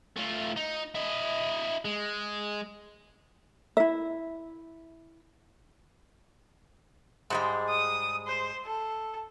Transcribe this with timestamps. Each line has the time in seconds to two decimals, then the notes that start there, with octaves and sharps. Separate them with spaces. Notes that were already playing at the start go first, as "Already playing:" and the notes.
0.17 A3 F4
0.56 D#4
0.95 E4 D#5
1.85 G#3
3.77 E4 E5
7.30 G#2 G3 G#3
7.69 D#6
8.27 C5
8.65 A4